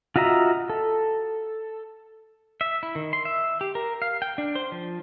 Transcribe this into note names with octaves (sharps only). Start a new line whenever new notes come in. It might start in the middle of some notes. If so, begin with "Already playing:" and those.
F4 F#4 D#5 E5 A#5
A4
E5
E4
D#3
C6
E5
G4
A#4
F5
G5
D4
C5
F3